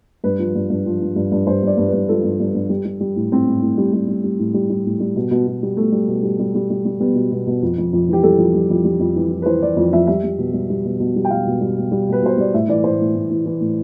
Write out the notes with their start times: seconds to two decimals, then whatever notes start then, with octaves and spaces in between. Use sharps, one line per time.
0.24 G2 B4
0.39 F3
0.55 G2
0.70 G2
0.86 F3
1.02 F3
1.16 G2
1.32 G2
1.47 G2 C5
1.63 G2 D5
1.77 G2
1.88 G2 B4
2.09 F3 A4
2.24 G2
2.40 G2
2.54 G2
2.70 G3
2.85 G3
3.01 G3
3.16 A2
3.32 A2 C4
3.48 A2
3.62 A2
3.78 G3
3.93 G3
4.08 G3
4.24 G3
4.39 A2
4.54 G3
4.70 G3
4.86 A2
5.00 G3
5.16 B2
5.31 B2
5.47 B2
5.63 G3
5.77 B2 A3
5.92 G3
6.08 B2
6.23 G3
6.39 G3
6.55 G3
6.70 G3
6.85 G3
7.00 G3 B3
7.15 B2
7.32 B2
7.47 B2
7.62 F2
7.78 F2
7.93 F2
8.09 E3 G4
8.23 G3 A4
8.38 F2
8.54 G3
8.70 F2
8.85 G3
9.00 F2
9.16 E3
9.32 E3
9.42 B4
9.46 E3 C5
9.62 E3 D5
9.77 F2
9.92 F2 E5
10.07 G3 E5
10.24 G3
10.38 B2
10.54 G3
10.70 G3
10.85 B2
11.00 B2
11.16 G3
11.25 G5
11.30 B2 F5
11.47 B2
11.61 G3
11.77 B2
11.92 G3
12.08 B2 B4
12.23 B2 C5
12.38 G3 D5
12.54 A2 E5
12.68 E3 D5
12.84 A2 C5
13.00 A2
13.15 A2
13.30 E3
13.46 E3
13.61 A2